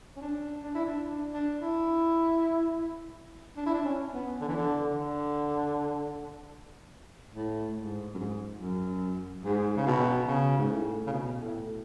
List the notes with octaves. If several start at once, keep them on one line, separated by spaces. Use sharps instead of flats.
C#4
D4
D4
E4
D4
D4
D4
E4
D4
E4
D4
C#4
B3
D3
E3
D3
D3
A2
G#2
F#2
G#2
F#2
G#2
C#3
B2
C#3
G#2
A2
C#3
B2
A2